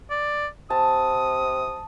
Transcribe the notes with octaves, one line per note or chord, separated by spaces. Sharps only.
D5
C3 A5 D#6